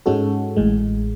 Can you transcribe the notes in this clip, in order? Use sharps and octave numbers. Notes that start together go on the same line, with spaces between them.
G#2 G#3 C#4 F#4 A4
A1 A2 G#3